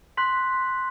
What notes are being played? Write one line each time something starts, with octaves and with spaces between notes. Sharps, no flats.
C6 F#6 B6